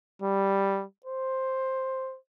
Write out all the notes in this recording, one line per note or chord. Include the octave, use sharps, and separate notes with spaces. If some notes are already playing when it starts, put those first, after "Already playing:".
G3
C5